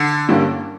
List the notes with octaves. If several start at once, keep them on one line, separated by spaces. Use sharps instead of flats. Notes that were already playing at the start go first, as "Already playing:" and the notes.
Already playing: D3
G2 D3 G3 A#3 C#4